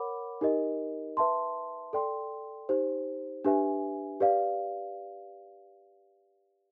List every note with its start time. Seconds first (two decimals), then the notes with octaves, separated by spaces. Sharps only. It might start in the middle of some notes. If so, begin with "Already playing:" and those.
Already playing: A#4 C#5 F#5 B5 D6
0.41 D#4 G4 A#4 D#5
1.17 B4 E5 A5 C6
1.93 A4 D5 G5 C6
2.69 D#4 G4 C5
3.45 D4 G4 B4 E5 G#5
4.20 G4 B4 D5 F5